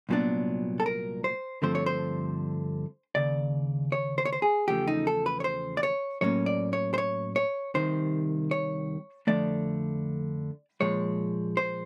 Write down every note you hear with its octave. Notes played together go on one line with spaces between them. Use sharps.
C2 A#2 F#3 B3 D4
A4
A#4
C5
G2 D3 F3 A3 C4 C5
C#5
C5
D#2 C#3 D5
C#5
C5
C#5
C5
G#4
E2 C#3 F3 A3 G4
D#4
A4
B4
C#5
C5
D5
C#5
A2 F#3 A#3 C#4 C#5
D5
C#5
C5
C#5
C#5
C2 C3 D#3 C5
C#5
F2 D3 F3 A3 D5
A#2 F3 G#3 C#5
C5